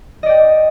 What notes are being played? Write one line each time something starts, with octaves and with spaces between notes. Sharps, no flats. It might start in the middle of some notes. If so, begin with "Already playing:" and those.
D5 D#5 G5